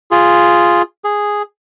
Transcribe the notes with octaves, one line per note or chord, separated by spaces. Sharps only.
F4 G#4
G#4